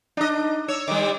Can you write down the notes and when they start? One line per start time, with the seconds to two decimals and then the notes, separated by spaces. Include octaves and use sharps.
0.17 D4 D#4 D#5
0.68 C#5 E6
0.88 D#3 G3 D6